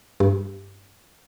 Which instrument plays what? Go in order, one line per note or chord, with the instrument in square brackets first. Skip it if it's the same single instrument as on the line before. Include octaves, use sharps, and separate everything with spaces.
[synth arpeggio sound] G2